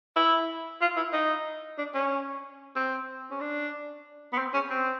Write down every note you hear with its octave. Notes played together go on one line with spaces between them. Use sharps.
E4
F4
E4
D#4
D4
C#4
C4
C#4
D4
B3
C4
C#4
C4